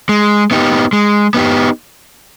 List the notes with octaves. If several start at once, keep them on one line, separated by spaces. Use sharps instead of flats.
G#3
B3 D#4 G4
G#3
B3 D#4 G4